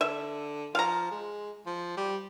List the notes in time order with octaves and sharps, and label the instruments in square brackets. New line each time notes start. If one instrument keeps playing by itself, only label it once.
[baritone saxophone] D3 [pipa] E5
[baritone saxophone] F3 [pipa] F5 A#5
[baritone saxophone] G#3
F3
G3